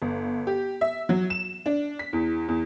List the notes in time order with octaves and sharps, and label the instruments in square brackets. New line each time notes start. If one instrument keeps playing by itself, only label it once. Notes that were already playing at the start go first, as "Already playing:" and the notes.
[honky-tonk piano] G1
G4
E5
F#3
E7
D4
B6
E2
E2